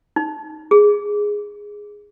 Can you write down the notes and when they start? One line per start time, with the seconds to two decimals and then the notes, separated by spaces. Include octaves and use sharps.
0.16 D#4
0.71 G#4